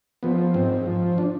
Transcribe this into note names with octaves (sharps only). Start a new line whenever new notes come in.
F3 B3
G#2 C4
F3
D4